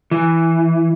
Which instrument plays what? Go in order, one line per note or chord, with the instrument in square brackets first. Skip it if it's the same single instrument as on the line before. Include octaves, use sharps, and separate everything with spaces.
[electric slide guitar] E3